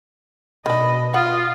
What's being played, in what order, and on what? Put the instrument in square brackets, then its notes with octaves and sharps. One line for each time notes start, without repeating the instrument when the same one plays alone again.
[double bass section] B2 [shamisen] D#3 D4 [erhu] D#5 [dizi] B5
[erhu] F4 [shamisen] F#5 [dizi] D#6